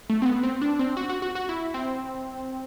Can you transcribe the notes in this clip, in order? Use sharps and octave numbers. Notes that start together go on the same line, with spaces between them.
A3
C4
B3
C4
D4
C4
F#4
F#4
F#4
F#4
E4
C4